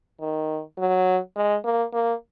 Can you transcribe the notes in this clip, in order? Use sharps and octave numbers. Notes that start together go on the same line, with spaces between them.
D#3
F#3
G#3
A#3
A#3